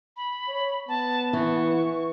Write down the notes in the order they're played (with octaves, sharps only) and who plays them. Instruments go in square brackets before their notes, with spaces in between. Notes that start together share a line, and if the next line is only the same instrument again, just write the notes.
[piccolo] B5
[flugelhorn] C#5
[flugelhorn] B3 [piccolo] A5
[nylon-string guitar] E3 [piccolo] C#6